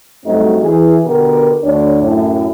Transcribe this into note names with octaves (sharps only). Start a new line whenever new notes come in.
G2 F#3 A3 C4 D#4 F#4
E3 G#4
B2 D3 B3 G4 A#4
D2 D4 C#5
F#2 A2